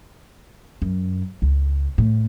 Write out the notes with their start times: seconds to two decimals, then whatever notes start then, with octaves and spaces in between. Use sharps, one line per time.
0.82 F#2
1.42 C#2
1.98 A2